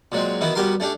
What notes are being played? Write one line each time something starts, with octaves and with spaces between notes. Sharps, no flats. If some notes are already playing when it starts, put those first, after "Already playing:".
A#2 F#3 G#3 C4
D#3 E3 B3 E4 F#4
G3 B3 F#4 G4 A#4 C6
A3 C#4 D4 G4